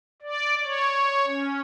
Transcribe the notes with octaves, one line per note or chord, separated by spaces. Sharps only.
D5
C#5
C#4